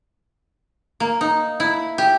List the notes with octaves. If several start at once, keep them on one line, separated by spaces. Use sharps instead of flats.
A#3
D#4
E4
G4